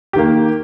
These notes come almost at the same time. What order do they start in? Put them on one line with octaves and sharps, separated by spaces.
G4 D#3 A#3